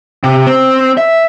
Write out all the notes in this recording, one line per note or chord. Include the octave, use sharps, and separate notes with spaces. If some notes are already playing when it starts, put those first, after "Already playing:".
C3
C4
E5